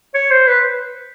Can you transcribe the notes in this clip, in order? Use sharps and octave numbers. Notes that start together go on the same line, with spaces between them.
C#5
C5
B4